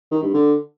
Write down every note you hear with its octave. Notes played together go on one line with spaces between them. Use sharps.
D#3
G2
D3